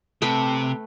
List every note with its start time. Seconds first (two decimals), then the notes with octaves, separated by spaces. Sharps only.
0.22 C3 A3 B4 G5